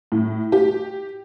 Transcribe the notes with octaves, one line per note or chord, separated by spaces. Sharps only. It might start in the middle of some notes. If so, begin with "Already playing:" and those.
A2
G4